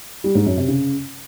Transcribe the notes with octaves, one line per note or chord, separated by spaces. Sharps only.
G3
G#2
F#2
C3
C#3